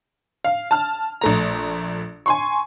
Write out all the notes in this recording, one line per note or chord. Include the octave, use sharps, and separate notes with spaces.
F5
A5 F6
A#1 A3 A#5
G#5 C6 C#6